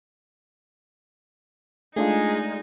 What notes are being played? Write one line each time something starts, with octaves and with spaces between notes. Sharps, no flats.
G#3 A3 D4 D#4 F4 G#4